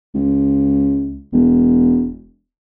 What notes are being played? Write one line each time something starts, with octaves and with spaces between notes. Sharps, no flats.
C#2
E1